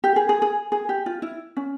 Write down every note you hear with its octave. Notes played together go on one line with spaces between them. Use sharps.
G4
G#4
G#4
G#4
G#4
G4
F4
E4
C#4